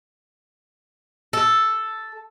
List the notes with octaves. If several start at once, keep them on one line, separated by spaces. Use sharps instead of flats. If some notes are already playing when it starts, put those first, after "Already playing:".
A4